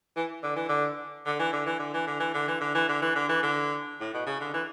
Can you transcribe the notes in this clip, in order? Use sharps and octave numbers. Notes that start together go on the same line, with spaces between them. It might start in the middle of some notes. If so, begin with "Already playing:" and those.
E3
D3
E3
D3
D3
E3
D3
E3
D3
E3
D3
E3
D3
E3
D3
E3
D3
E3
D3
E3
D3
A2
B2
C#3
D3
E3